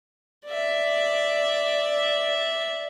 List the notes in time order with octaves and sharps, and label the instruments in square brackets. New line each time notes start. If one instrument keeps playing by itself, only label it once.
[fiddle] D5 E5